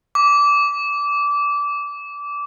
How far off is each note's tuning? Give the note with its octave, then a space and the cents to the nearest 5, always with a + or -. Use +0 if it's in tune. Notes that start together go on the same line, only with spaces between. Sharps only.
D6 -20